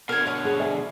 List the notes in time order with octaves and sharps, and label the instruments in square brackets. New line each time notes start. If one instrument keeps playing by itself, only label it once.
[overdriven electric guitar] B2 D3 [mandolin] A#4 G#5
[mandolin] C#5 F#5 [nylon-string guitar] D5
[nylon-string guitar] G#4
D5 E5 G#5